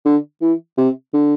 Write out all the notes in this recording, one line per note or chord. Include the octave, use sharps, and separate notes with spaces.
D3
E3
C3
D3